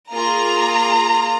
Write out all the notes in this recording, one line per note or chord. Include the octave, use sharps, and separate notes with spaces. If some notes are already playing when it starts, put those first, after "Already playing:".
A#3 F4 G#4 A#5